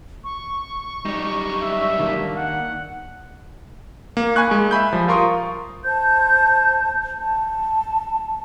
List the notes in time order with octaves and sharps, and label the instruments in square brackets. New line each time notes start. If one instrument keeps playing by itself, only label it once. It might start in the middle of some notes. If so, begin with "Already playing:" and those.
[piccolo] C#6
[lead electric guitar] F#2 G3 [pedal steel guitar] D#4
[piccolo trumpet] E5
[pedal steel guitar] D#3 A#3 D4
[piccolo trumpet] F#5
[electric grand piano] A#3
G#5 B5 C#6 F#6 G#6
G#3 A#3
E5 G#5 B5 G6
F3 G3
F4 A#4 C6 C#6 D#6
[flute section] C5 A5 G6
A5